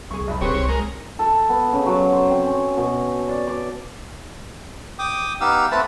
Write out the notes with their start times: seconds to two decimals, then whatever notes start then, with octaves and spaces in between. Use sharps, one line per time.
0.11 C2 G#4 C#6
0.27 B1 B5
0.41 D#1 C4 G4 G#4 B4 C#5
0.54 C2
0.69 G#3 A#4
1.19 A4
1.49 B3
1.73 C#3
1.86 F#3
2.13 C5
2.30 C4
2.47 C#4
2.77 B2
3.29 D5
3.47 D5
4.99 G5 D6 D#6
5.41 B3 D#4 G4 F5 E6
5.71 A3 C4 B4 F#5 A5 B5